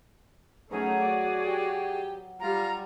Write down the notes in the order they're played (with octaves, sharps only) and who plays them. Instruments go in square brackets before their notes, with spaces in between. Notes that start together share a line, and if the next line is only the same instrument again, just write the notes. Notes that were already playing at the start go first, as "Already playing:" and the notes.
[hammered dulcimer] F#3 B4 [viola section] A3 C#4 D#4 [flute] G#4
[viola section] F#4 D5
[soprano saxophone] G4
[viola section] G3 [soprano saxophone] F4 [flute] A#5